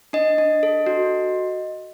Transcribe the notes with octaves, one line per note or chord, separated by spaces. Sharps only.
D4 D#5
D4
A4
F#4